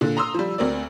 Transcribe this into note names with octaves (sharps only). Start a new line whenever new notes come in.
A#2 D3
A#5 C6 D#6 E6
F3 G3
D2 C4 A#4 D5